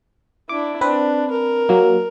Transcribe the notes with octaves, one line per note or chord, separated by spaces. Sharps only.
D4 E4 D6
C4 D4 B4
A#4
F#3 A#3